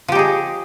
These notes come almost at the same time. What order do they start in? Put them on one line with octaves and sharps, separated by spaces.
F3 G4 D#4 G#4